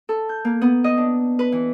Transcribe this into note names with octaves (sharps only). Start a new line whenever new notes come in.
A4
G6
A#3
B3
D#5
D4
B4
E3